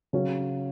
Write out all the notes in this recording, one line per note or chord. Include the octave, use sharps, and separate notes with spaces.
C#3 F#3 C#4